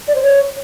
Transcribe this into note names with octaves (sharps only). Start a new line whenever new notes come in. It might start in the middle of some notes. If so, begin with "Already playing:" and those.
D5
C5
C#5